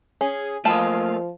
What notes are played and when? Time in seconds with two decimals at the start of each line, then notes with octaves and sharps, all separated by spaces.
0.21 C#4 G#4
0.65 F3 A3 A#3 D#5 F5 G5 A5 B5